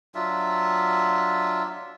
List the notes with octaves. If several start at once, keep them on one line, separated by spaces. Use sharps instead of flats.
F#3 D4 F4 E5